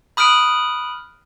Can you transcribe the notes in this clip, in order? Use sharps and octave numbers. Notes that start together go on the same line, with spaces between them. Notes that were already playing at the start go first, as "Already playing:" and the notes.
B5 D#6 F6 F#6 D7